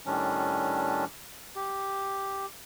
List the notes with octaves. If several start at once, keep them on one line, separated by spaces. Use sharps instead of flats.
A2 D#3 G3 C#4 D4
G4